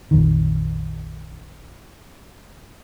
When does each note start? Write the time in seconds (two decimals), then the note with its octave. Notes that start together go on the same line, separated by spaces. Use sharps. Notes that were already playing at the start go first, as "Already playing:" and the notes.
0.11 A#1 F2 D#3